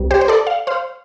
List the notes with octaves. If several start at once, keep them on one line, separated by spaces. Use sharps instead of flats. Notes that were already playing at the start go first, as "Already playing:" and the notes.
Already playing: C2 C3 G3
G4 C5
C5
A4 D5
F5
C5 F5